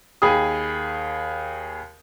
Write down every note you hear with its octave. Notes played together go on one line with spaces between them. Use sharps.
D#2 G#4 G5 B5 D#6